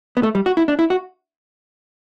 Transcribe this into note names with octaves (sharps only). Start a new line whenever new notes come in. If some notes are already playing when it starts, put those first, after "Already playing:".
B3
A3
G3
F#4
E4
D4
E4
F#4